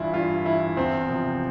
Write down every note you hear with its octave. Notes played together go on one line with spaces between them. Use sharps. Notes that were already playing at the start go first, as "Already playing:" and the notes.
Already playing: G2 E3 E4 F4
G2 F4
E3 E4
E2 C4
C3 F3